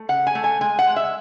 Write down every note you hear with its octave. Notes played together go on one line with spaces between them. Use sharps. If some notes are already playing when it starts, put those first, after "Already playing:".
Already playing: A3
C#3 F#5
G#5
A3
G#5
G#3 G#5
F#5
G#3
E5